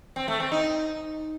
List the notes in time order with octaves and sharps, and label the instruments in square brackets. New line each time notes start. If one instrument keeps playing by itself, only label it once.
[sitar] C4
A3
C4
D#4